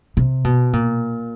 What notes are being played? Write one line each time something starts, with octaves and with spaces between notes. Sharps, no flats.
C3
B2
A#2